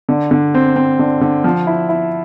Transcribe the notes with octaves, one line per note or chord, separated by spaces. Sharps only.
D3
D3
C4
C4
D3
D3
F3
E4
E4